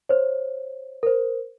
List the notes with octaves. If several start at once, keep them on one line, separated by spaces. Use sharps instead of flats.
C5 C#5
A#4 C5